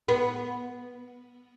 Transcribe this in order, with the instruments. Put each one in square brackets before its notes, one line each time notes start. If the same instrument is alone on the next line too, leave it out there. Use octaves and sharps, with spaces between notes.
[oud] B3